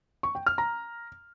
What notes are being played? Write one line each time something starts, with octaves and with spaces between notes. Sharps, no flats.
C#6
G5
F6
A#5